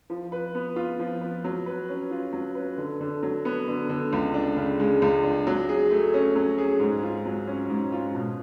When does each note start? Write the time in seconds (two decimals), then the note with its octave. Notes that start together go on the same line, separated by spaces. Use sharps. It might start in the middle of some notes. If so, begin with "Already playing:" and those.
0.10 F3
0.32 B4
0.55 B3
0.76 F4
0.99 F3
1.21 B4
1.44 F#3
1.66 B4
1.89 C#4
2.11 F4
2.33 F#3
2.55 B4
2.77 D3
3.01 D3
3.23 F#3
3.45 B3
3.68 D3
3.89 D3
4.13 C#2
4.34 D4
4.57 C#3
4.80 G#3
5.02 C#2
5.24 D4
5.47 F#3
5.69 G#4
5.91 A3
6.14 C#4
6.36 F#3
6.58 G#4
6.80 G#2
7.03 F4
7.25 F#3
7.47 C#4
7.70 G#2
7.92 F4
8.14 B2